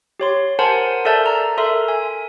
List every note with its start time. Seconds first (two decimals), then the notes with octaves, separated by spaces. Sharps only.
0.20 G4 C#5 C6
0.59 A#4 C5 F#5 G#5 A5 C6
1.05 A4 A#4 D5 E5 A5 G6
1.26 A#5
1.58 A4 A#4 E5 C6
1.88 G#5